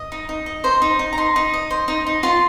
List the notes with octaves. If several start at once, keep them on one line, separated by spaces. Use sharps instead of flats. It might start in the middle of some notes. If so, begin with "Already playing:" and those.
Already playing: D#5
D#4
D#4
D#5
C5 A#5
D#4
D#4
A#5
D#4 C6
D#4
D#5
C5
D#4
D#4
F4 C6